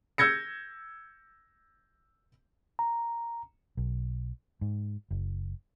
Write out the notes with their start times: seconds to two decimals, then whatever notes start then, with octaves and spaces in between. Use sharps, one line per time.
0.18 E6 G6 G#6 A#6 C#7
2.79 A#5
3.77 B1
4.61 G#2
5.11 F#1